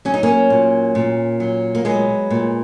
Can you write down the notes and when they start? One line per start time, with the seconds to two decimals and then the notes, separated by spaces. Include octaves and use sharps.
0.05 F#3 C#4
0.14 D#4
0.23 A#3 C#4
0.50 A#2
0.95 A#2
1.40 F#3
1.75 A#3
1.85 F#3 G#3 B3
2.30 A#2